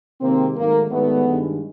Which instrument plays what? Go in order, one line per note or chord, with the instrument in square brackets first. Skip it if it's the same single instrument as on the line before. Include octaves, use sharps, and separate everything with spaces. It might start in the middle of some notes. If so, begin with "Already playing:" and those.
[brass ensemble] C3 D#3 G#3 A#3 C4
G#2 D#3 F#3 A3 A#3
G#2 D#3 G3 A3 B3
G2 D#3 G#3